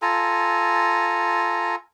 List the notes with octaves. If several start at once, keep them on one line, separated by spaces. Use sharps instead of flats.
F4 A4 G#5 A#5